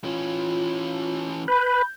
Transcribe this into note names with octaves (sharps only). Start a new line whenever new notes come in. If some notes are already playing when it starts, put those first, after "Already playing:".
E3 C#4 F4
B4 B5 G6